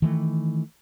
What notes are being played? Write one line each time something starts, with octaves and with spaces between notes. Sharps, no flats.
D#3 E3 A3